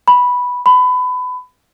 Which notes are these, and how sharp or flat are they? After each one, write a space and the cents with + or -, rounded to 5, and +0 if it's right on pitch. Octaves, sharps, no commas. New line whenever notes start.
B5 -5
B5 +25